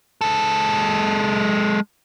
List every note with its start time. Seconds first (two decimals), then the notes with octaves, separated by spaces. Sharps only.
0.21 G#3 A4